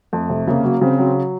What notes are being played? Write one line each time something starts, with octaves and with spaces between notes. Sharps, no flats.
F2 A3
C3
C#3 A#3
F#3
C#3 C4
F#3